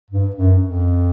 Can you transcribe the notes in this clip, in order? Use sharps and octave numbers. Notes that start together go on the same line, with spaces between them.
G2
F#2
F2